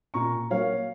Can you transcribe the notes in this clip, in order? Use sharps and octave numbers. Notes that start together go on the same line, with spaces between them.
A#2 A#5 C#6
F#3 A#3 C#5 F5